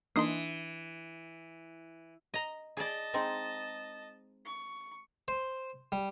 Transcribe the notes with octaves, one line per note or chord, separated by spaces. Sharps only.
E3 A#3 D4 D#4 C6 D#6 C7
D#5 A#5
G#4 D5 D#5 A5
G#3 C4 D#4
C#6
C5
G3